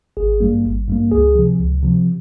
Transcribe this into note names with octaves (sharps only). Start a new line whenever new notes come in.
G#1 G#4
G2 G3 A#3
G#1
G2 G3 A#3
C#2 G#4
C3 F3
C#2
C3 F3